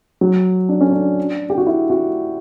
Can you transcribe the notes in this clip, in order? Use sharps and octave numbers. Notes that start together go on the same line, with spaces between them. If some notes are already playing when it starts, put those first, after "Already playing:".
F#3
D4
C#4
D4
G4
F#4
E4
F#4